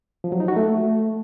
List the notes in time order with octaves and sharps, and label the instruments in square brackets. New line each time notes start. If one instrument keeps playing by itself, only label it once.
[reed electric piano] F3
F#3
D#4
F#4
A3